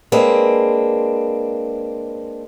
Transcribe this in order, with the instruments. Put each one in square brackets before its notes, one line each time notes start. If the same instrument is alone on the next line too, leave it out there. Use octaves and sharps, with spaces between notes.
[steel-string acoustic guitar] G#3 A#3 C4 D4 B4